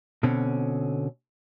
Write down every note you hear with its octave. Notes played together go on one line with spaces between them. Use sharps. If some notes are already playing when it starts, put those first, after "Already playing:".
B2 D3 C4 C#4